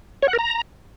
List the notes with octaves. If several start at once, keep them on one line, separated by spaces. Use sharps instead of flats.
C#5
F#5
A#4
A#5